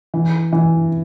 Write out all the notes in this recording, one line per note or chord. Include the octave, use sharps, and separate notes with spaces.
E3
E3